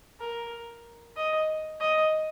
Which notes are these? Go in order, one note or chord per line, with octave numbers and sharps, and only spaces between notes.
A#4
D#5
D#5